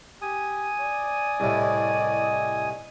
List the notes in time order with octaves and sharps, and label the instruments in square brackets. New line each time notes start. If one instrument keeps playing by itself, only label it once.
[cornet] G4 [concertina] G#5 D#6
[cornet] D5
[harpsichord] C2 A2 [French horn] D#5